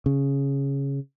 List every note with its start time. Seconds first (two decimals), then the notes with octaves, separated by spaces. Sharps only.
0.06 C#3